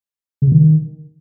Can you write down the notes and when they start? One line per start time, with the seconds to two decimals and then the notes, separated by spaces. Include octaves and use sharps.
0.42 C#3
0.47 C3
0.52 D#3